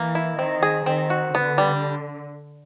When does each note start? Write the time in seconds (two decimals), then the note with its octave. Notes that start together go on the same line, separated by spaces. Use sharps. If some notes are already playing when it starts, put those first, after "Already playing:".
Already playing: E3 A#3
0.15 E4
0.39 D#3 C4
0.63 G#4
0.86 D#3 C4
1.10 F#4
1.35 D3 B3
1.58 G3